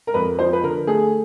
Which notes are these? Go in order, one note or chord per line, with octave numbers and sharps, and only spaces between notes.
A#4
F2 B4
F3 C5
B4
D3 A#4
A3 G#4